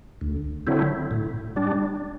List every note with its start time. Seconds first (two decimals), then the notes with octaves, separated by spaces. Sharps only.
0.21 D2
0.67 D3 F#3 C4 E4
1.11 A2
1.56 G3 D4